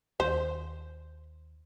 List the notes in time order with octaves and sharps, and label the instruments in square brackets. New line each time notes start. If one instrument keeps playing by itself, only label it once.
[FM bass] D#2 [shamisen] C5